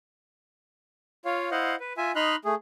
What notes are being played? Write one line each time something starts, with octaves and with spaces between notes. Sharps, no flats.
F4 C#5 F5
E4 C5 D#5 F5 F#5
B4
F4 E5 G#5
D#4 D#5 B5 C6 F6 F#6
A3 G#4